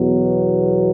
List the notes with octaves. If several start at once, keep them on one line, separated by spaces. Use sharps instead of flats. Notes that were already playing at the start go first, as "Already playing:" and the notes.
Already playing: E2 B2 F#3